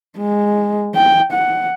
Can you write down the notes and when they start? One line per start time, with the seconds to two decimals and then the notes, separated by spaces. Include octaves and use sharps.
0.19 G#3
0.94 G5
1.32 F#5